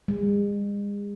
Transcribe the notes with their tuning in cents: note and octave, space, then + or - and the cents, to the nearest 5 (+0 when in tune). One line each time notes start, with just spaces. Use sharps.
G#3 -40